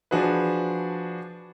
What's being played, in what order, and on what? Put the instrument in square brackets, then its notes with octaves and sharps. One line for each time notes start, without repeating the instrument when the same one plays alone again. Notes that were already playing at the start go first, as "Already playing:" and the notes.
[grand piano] F3 D4 F#4 G#4 B4